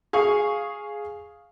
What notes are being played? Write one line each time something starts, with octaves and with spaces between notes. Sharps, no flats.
G#4 F5 C#6